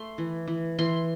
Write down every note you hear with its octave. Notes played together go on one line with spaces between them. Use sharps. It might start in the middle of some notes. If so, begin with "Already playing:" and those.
Already playing: A3 C6
E3
E3
E3 C6